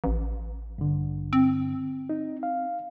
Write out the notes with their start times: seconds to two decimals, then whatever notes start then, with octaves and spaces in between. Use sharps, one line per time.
0.04 A1
0.78 G2 D3
1.33 C4
2.09 D#4
2.43 F5